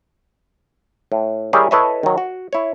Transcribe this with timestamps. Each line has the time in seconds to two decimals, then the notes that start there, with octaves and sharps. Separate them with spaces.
1.12 A2
1.53 G3 E4 G4 G#4 A#4 C#5
1.71 E4 A4 B4 C#5 D#5 E5
2.03 D#3 F#3
2.18 F#4
2.53 E4 C#5